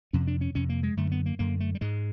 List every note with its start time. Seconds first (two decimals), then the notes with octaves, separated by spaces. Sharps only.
0.13 F2 C3 C#4
0.27 D4
0.41 C#4
0.55 F2 C3 C#4
0.69 A#3
0.83 G#3
0.97 F#2 D3 A3
1.12 B3
1.26 A#3
1.39 F#2 D3 A#3
1.60 A3
1.75 G3
1.81 G#2 G#3